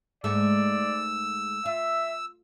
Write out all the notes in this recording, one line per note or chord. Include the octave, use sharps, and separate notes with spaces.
G#2 G#3 A3 D5 E6
F4 E5